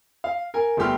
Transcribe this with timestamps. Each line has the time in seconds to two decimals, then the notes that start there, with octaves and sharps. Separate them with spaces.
0.24 F5
0.54 A#4 G#5
0.77 G1 G3 A3 G4 C6 F6